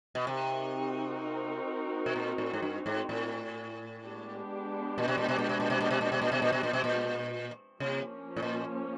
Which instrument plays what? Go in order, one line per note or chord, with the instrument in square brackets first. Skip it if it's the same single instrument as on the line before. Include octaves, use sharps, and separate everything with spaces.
[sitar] B2
[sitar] C3 [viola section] C4 D#4 F#4 A#4
[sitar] B2
A#2
A2
G#2
G2
G#2
A2
[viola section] G#3 B3 D4 G4
[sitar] A#2
B2
A#2
B2
A#2
B2
A#2
B2
A#2
B2
A#2
B2
A#2
B2
A#2
B2
A#2
B2
A#2
[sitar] C3 [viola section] F3 A#3 C#4
[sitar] A2
A#2